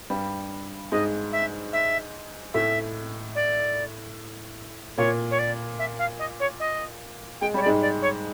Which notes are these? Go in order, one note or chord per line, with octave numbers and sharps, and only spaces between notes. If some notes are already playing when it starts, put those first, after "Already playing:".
G2 G3
G#2 G#3 D#5
E5
E5
A2 A3 E5
D5
A#2 A#3 C#5
C#5
D5
E5
F5
D#5
C#5
D#5
G#3 G5
G3 C#5
D5
G#2 G#3
D5
C#5